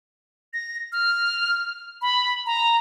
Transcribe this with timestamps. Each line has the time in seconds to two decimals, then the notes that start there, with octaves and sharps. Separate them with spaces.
0.53 A#6
0.92 F6
2.02 B5
2.46 A#5